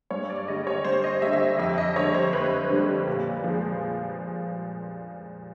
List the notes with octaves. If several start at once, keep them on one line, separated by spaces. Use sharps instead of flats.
G2 C#5
D5
D3 G3 D#5
C#5
G2 C5
D#5
D3 G3 E5
E5
D#5
F2 E5
D#5
D3 G3 C#5
C5
F2 B4
D3 G3
A#2
F3 G#3